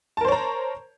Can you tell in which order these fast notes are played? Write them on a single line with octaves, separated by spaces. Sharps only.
A5 A#4 C5 C#5 A#5